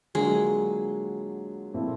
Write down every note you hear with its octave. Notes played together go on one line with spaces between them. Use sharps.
D3 F#3 G#3 A#3 D4 F4
A#2 F3 A3 C4 E4